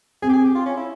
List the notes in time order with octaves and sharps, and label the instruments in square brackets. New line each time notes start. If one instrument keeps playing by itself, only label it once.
[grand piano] C4 [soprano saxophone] G#4
[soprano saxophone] G4
G#4
G4
F4
C#4
E4